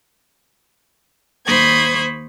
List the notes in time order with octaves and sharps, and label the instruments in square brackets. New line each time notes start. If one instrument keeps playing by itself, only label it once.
[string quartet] D#2 C5 B5 C#6 D#6 G#6